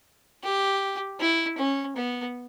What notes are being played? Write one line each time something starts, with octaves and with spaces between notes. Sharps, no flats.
G4
E4
C#4
B3